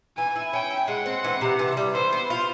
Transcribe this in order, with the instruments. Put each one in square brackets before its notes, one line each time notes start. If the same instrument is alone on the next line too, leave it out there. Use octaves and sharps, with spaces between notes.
[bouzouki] E3 [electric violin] G#5
[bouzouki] E4
[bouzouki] C#4 [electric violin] G5
[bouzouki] E4
[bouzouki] G#3 [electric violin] F#5
[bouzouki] C4
E3
C3
E3
G3
[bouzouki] E3 [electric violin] C5
[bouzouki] B3
F4